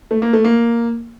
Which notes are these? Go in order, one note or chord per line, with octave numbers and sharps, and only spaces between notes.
A3
A#3
A3
A#3